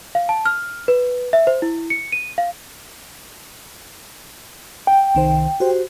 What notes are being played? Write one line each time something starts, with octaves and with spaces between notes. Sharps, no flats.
F5
A5
F6
B4
E5
C5
E4
C#7
D#7
F5
G5
C2 D#3 C5
F#4 G4 C5